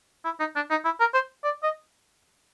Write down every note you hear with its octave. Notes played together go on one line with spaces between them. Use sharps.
E4
D#4
D4
D#4
E4
A#4
C5
D5
D#5